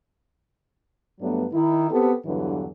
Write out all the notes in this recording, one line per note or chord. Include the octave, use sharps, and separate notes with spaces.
G2 F#3 A3 B3 D4
D#3 D#4 E4
B3 C4 G4 A4
E2 G2 D3 E3 F#3